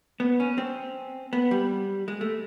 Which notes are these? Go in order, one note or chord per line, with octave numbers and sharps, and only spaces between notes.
B3
C#4
C4
B3
G3
G#3
A3